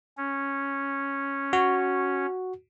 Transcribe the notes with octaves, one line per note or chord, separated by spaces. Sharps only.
C#4
F#4